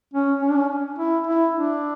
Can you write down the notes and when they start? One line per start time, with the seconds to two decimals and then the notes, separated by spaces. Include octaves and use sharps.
0.14 C#4
0.42 C#4
0.49 D4
0.57 C#4
0.99 E4
1.27 E4
1.55 D4